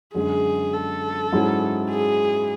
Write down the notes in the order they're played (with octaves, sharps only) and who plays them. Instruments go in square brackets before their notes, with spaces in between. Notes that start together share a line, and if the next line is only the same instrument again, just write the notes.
[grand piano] F#2 D3 G#3 [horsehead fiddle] G#4
[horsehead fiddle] A4
[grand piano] G#2 F#3 C#4 E4 G#4
[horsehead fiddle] G#4